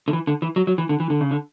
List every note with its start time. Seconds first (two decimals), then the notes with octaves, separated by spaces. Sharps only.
0.08 D3
0.13 E3
0.27 D3
0.42 E3
0.56 F#3
0.67 F#3
0.78 E3
0.89 D3
1.00 E3
1.10 D3
1.21 C#3
1.31 D3